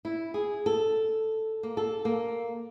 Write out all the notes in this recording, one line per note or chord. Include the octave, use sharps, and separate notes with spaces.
E4
G#4
A4
A#3
A4
A#3